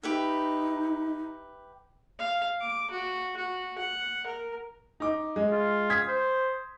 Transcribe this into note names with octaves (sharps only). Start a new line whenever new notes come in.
D#4 G4 B4 E5
F5
D6
F#4
F#4
F#5
A#4
D#4 D6
G#3
F4
D#6 G#6 B6
C5